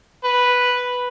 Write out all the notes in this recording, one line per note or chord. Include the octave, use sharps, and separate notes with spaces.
B4